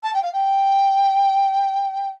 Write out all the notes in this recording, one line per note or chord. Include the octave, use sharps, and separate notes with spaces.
A5
G5
F5
G5